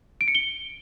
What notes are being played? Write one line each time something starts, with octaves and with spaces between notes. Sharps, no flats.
D7
C#7
G7